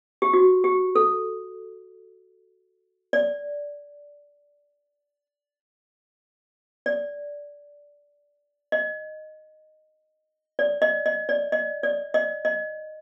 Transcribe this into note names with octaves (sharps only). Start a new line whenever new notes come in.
G4
F#4
G4
A4
D5
D5
D#5
D5
D#5
D#5
D5
D#5
D5
D#5
D#5